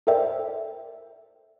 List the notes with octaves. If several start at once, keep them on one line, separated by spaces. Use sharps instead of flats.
A4 A#4 C5 D5 E5 G5